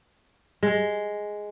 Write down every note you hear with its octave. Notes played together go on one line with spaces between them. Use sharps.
G#3